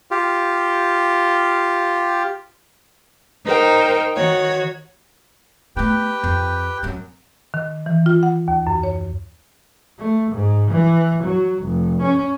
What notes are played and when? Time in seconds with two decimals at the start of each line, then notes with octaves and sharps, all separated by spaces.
0.11 F4 G4
3.46 D#4 A#4 C5 G5
4.15 D#3 F#4 C#5
5.76 A3 B3 G4 B4 G5
6.24 F2
6.83 F#2 C4
7.54 D#3
7.86 E3
8.06 F4
8.23 F#5
8.48 D#2
8.67 F#2
8.83 C#5
9.99 A3
10.32 G#2
10.71 E3
11.23 F#3
11.64 F1
12.02 C#4